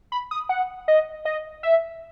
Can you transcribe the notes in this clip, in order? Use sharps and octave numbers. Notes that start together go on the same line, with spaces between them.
B5
D#6
F#5
D#5
D#5
E5